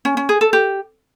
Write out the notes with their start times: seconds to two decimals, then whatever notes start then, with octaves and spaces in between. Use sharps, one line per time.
0.05 C#4
0.17 C#4
0.29 G#4
0.41 A4
0.53 G4